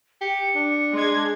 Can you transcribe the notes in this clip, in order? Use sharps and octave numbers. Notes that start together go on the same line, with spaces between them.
G4 C#7
D4
G#3 C6 G#6